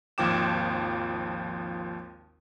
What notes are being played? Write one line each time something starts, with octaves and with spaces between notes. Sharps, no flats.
G#1 D#2 F3 G5 D6 E7